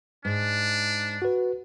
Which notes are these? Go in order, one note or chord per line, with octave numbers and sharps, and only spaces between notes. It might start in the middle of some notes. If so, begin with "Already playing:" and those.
G#2 D4
F#4 B4